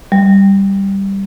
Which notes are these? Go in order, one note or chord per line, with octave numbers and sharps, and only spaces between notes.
G3